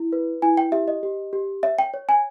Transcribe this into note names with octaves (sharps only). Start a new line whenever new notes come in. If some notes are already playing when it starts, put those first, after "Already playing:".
Already playing: E4
B4
E4 G#5
G5
G4 E5
D#5
G4
G4
C#5 E5
G5
C#5
G#5